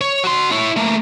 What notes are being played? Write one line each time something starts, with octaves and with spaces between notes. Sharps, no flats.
C#5
F#4 C6
E4 C#5
A3 A#3